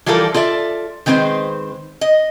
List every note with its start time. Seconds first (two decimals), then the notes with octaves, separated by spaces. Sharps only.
0.06 E3 F3 G3 F4 A4 A#4
0.34 F4 A4 D5 E5
1.06 D#3 G#3 C4 B4 C5
2.01 D#5